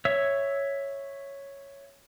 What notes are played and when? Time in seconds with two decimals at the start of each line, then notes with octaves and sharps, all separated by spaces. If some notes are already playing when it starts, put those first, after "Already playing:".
0.05 C#5 E5 E6